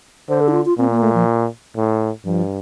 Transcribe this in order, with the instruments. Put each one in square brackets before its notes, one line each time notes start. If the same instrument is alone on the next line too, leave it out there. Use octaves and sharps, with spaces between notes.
[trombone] D3 [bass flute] C5
[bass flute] A4
D#4
F4
F4
[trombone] A#2 [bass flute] C4
[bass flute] A#3
A3
F3
[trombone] A2
[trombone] G2 [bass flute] F3